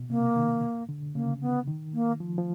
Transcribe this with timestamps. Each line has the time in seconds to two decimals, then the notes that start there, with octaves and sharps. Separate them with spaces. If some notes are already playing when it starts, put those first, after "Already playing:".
Already playing: B2
0.10 C3 A#3
0.36 D#3
0.89 D3
1.15 C#3 A#3
1.41 B3
1.68 D#3
1.94 A#3
2.20 F3
2.38 F3